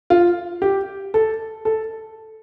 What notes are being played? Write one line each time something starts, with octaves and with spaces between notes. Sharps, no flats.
F4
G4
A4
A4